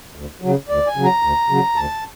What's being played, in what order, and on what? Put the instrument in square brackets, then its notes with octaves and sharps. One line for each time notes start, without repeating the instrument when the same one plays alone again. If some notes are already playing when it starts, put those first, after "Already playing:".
[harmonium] D2
C#3 F#3
D2 D5
G#5
C#3 F#3
A#5
D2
C#3 F#3
D2 A5